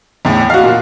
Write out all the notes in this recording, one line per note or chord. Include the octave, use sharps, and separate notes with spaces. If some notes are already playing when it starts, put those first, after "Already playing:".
E2 A2
F#4 F5
A#2